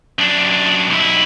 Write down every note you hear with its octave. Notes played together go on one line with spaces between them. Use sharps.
F#2 D4
B1 E4